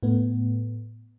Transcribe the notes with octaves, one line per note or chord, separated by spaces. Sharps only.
A2 A3 B3